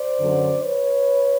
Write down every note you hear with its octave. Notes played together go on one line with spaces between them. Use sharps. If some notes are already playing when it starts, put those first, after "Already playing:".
Already playing: C5 D5
F#2 D3 F#3
B4 C#5